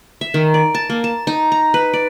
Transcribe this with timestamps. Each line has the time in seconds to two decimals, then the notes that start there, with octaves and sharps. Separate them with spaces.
0.21 E5
0.34 D#3
0.54 D5
0.75 A5
0.90 A#3
1.04 A5
1.27 D#4
1.52 A#5
1.74 B4
1.93 D5